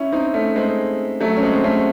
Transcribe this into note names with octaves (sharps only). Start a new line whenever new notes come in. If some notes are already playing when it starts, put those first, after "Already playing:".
Already playing: C#4 E4
C4 D#4
A3 C#4
G#3 C4
F#3 A3
C#4
G#3 C4
C4
A3 C#4